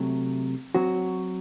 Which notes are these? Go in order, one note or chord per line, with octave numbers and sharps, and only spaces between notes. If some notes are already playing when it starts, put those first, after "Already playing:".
Already playing: C3 F#3 A3
F#3 C4 F#4